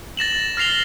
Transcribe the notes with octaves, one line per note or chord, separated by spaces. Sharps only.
A6 A#6 E7 F#7
F6 A#6 C7 F7 G7